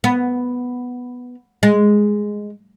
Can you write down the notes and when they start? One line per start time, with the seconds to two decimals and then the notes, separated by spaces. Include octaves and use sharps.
0.04 B3
1.63 G#3